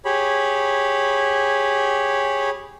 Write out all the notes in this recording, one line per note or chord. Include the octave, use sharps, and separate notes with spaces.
G4 G#4 C#5 B5